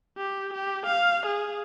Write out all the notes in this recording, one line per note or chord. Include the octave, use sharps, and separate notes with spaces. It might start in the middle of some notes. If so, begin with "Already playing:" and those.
G4
G4
F5
G#4